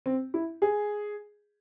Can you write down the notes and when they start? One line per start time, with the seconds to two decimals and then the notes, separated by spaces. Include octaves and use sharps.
0.06 C4
0.34 E4
0.62 G#4